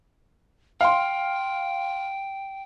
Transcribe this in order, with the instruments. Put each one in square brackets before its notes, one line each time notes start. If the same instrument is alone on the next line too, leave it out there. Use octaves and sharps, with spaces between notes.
[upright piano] F5 C6 [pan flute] G5